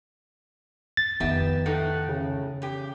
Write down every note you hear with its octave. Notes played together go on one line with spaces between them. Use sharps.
A6
F2 D#3 B3 D#4 G4 E5
A2 A3 D#4 F#5
C#3
E2 G4